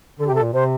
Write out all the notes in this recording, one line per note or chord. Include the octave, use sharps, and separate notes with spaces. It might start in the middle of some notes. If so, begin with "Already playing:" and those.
D3 A4
G4
C3 A4
A#2
C3 C5